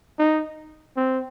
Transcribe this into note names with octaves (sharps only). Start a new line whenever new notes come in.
D#4
C4